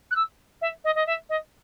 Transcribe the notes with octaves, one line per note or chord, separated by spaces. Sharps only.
F#6
E6
E5
D#5
D#5
E5
D#5